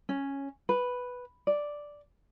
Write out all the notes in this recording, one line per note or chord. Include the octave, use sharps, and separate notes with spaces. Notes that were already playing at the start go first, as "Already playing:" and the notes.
C#4
B4
D5